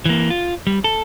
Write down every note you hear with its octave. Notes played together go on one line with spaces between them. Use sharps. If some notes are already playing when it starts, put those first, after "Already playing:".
E3 A#3
F4
G3
A4